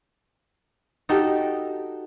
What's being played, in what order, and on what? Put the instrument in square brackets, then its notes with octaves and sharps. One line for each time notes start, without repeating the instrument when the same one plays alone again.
[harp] D#4 F#4 G4 A4